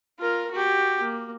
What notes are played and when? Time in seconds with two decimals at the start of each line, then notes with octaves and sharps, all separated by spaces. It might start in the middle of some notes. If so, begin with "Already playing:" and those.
0.20 F4 A#4
0.51 F#4 G4
1.01 A#3